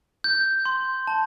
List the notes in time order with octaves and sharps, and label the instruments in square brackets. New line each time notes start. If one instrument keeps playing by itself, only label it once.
[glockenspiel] G6
C6
A5